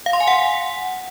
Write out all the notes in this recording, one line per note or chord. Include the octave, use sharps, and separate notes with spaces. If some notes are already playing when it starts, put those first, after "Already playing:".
F5
C6
G#5
F#5